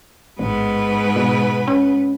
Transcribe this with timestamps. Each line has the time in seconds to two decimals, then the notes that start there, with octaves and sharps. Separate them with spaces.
0.39 A1 G#2 B3 B4
1.16 B2
1.68 C#4